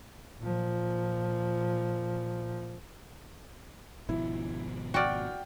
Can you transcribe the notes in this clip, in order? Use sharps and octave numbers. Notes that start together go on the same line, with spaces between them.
A#2 F3
G#1 B2 F3 E4
F#4 D5 G5 F6